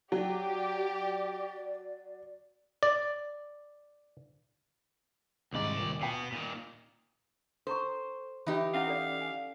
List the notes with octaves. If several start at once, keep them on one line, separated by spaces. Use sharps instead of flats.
F#3 G4 D5
D5
D#1 C2 G#2 D5
D#1 A#2 E7
B2 B3 G5 C7
A#2 D#3
A4 C5 A#5 C#6
E3 D#4 G4
C#4 E4 F5 F#5
A4 D5
G#5